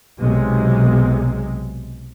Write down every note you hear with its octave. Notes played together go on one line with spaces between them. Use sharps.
B1 C3 G#3